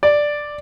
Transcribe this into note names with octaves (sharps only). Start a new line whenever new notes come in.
D5